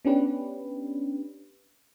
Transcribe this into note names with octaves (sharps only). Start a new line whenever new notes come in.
B3 C#4 D4 G4 B4